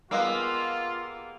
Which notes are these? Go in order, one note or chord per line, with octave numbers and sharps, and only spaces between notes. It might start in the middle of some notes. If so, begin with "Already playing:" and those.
G3 G#3 A#3 B3 F4 F5 D6 E6